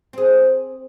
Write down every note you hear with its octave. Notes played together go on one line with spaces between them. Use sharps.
C4 G#4